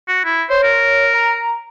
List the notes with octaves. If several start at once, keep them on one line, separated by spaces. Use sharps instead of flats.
F#4
E4
C5 C#5
A#4
A#5